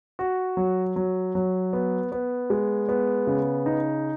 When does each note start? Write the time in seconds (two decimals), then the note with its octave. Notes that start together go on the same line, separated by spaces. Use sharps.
0.19 F#4
0.57 F#3
0.96 F#3
1.35 F#3
1.73 B3
2.12 B3
2.50 G#3
2.89 B3
3.27 C#3
3.66 D#4